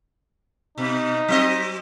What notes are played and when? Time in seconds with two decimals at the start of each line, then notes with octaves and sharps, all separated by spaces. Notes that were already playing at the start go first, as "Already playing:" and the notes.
0.78 B2 D#4
1.28 F#3 C4 D#5